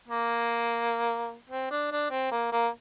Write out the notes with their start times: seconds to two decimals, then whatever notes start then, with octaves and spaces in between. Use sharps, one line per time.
0.08 A#3
1.50 C4
1.71 D4
1.91 D4
2.11 C4
2.31 A#3
2.52 A#3